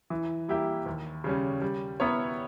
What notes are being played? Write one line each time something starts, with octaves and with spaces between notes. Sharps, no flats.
E3
G3 A#3 E4 G4
D#2
C#3 G3 C#4
G3
B3 E4 A#4 C#5